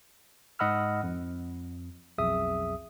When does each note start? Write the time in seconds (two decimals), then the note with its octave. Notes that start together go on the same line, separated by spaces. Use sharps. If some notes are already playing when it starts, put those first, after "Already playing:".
0.59 G#2 D#5 F#5 B5 E6 F6
1.03 F2
2.18 B1 F2 G#4 E5 D#6